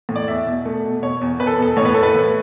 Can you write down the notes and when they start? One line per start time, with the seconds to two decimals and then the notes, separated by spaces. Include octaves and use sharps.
0.09 A2
0.16 D5
0.28 E2 E5
0.46 B2
0.65 A3
0.84 B2
1.02 B2 C#5
1.21 E2
1.40 E2 B4
1.47 A4
1.58 B2 A4
1.77 A2 C#5
1.85 B4
1.94 A3 A4
2.03 B4
2.14 A2